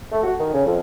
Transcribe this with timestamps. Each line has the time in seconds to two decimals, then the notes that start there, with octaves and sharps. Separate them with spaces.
0.11 A3
0.23 F#4
0.38 D#3
0.53 C#3
0.64 F2